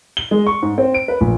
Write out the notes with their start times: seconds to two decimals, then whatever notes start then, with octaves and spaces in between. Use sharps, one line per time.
0.17 G7
0.31 G#3
0.47 C#6
0.62 G#2
0.78 C4
0.94 D7
1.08 B4
1.21 A#1